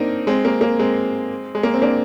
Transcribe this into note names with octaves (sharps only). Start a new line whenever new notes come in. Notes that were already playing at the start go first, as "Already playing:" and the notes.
Already playing: A#3 C4 D4 D#4
G#3 C4
A#3
A#3
G#3 C4
G#3
A#3
C4
A#3 D4